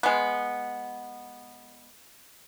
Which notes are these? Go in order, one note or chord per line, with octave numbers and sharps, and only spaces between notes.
G#3 B3